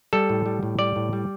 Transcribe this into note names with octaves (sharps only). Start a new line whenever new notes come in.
G3 A4
A2
G3
A2
G3 D5
A2
G3